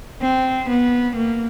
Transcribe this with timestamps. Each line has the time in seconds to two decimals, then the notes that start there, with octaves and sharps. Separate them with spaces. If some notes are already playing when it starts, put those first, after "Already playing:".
0.22 C4
0.69 B3
1.15 A#3